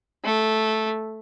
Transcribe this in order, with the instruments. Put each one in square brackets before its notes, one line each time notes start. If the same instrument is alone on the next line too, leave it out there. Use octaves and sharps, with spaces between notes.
[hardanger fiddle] A3